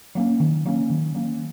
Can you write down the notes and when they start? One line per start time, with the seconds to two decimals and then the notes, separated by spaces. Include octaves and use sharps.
0.15 F#3 A#3 C#4
0.40 D#3
0.66 F#3 A#3 C#4
0.90 D#3
1.15 F#3 A#3 C#4